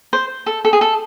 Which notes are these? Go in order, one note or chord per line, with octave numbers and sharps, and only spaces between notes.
C5
A4
A4
G#4
A4